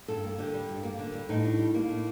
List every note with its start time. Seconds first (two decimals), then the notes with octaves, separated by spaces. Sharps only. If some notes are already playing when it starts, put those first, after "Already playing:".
0.08 G2 A4
0.23 A#3
0.38 D3 G4
0.54 G3
0.69 G2
0.83 A#3
0.99 D3
1.14 G3
1.29 A2 D#4
1.45 D4
1.59 G3
1.74 A#3
1.89 A2